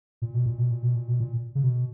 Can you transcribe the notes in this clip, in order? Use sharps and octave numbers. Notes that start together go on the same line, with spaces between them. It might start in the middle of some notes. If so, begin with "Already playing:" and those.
A#2
B2
A#2
B2
A#2
B2
A#2
B2
A#2
C#3
B2